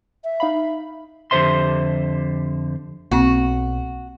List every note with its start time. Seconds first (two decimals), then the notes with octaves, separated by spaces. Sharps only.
0.24 E5
0.40 D#4 F5 B5
1.31 F2 D3 G4 C5 E5 C6
3.11 B1 A#3 C4 F#4